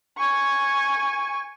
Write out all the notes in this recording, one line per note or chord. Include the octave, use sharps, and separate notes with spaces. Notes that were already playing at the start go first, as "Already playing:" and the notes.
G#5 C#6